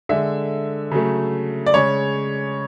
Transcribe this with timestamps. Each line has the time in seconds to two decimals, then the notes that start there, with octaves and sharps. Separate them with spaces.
0.09 D3 G#3 E5
0.91 C#3 F#3 A3
1.66 D5
1.74 C#3 G#3 C#5